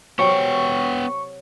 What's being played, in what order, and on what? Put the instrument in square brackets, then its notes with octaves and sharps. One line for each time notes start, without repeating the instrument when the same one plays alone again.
[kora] C3 F#3 [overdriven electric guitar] B3 G5 [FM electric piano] C#6